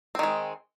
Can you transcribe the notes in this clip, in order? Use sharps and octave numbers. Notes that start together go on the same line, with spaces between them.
D#3 G#3 C4